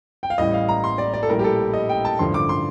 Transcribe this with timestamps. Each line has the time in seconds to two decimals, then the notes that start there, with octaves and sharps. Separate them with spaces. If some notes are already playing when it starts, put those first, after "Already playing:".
0.23 G5
0.30 F5
0.38 A1 A2 G3 D#5
0.54 F5
0.69 A#5
0.84 C6
0.98 D5
1.14 D5
1.23 A4
1.29 A#1 A2 G3 A#4
1.39 G4
1.44 A4
1.74 D#5
1.89 G5
2.05 A5
2.19 A1 G2 D3 F3 C6
2.34 D6
2.49 C6